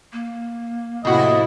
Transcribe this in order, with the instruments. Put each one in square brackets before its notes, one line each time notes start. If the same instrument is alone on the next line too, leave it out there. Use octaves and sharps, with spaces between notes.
[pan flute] A#3
[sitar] F2 F#4 [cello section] A2 C3 E4 [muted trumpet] D#5